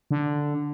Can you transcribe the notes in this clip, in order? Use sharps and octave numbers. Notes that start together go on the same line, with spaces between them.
D3